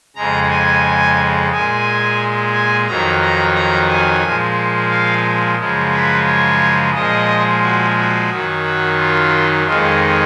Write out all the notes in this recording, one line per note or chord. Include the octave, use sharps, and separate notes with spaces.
F2 C#3 G#3 A#5
G#5
A#2 G#3 G#5
G#5
F2 D#3 F#3 A#5
A#5
A#5
G#5
A#2 F3 G#3
F5
F#2 C#3 F3 G#3
B4
C#5
A#2 F3 G#3 D#5
F#4
F#4
F#2 D#3 F#3
F#4
F4
F2 D#3 G#3 F4